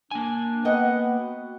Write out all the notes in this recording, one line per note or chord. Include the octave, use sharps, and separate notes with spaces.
A#3 D4 G#5
B3 D#5 F#5 G5
F#4